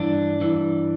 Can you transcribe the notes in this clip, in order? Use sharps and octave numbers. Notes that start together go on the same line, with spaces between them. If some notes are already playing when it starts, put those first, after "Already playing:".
Already playing: G2 E3 D4
G2 E3